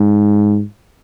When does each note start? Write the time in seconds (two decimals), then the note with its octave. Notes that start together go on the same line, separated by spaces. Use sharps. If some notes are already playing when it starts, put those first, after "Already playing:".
Already playing: G#2